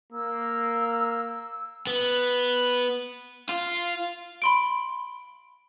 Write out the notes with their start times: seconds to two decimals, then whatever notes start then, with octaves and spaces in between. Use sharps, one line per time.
0.13 A#3 E6
1.87 B3
3.49 F4
4.42 B5 C6 D7